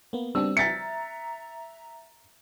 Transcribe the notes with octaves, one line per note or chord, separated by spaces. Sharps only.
A#3 B3
G3 C4 D4 E6
E5 A#5 A6 B6 C#7